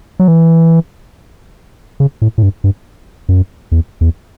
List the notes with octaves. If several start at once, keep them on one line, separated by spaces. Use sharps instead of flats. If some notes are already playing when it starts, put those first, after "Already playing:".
F#3
E3
C#3
A2
A2
G2
G2
F#2
E2
E2